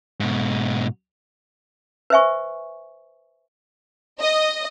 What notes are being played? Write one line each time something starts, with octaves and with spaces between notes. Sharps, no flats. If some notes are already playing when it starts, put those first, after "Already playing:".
G#2 B2
B4 C5 E5 G#5 C#6
D#5